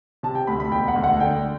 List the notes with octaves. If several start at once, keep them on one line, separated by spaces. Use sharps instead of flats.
C3 A5
G5
D2 B5
B5
E1 G5
F#5
D2
F#5
D3 G5